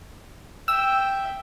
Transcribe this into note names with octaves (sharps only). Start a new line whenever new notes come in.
E5 G5 E6